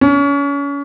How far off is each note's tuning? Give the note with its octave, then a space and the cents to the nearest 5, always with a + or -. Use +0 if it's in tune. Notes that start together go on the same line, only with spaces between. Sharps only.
C#4 +30